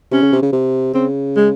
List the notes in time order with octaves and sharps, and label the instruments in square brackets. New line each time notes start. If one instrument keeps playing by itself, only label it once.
[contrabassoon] C3 [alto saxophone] C#4
[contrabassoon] C#3
C3
C#3
C3
[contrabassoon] C#3 [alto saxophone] C4
[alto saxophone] G#3